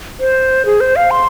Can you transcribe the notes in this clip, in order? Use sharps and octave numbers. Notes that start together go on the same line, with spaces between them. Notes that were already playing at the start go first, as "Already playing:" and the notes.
C5
G#4
C5
F5
C6